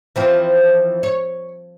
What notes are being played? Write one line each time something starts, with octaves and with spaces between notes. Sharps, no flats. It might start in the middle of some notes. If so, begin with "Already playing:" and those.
E3 F3 C4
C#5